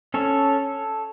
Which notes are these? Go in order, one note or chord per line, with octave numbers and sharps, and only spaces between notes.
C#4 A4 C#5